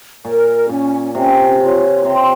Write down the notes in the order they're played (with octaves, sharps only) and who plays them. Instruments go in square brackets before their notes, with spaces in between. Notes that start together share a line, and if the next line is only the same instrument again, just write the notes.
[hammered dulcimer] A#2 [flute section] A#4
[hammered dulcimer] A#2 [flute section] C#4
[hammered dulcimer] C3 [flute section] C#4
[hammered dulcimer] C#3 [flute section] F4
[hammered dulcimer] C3 [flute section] C6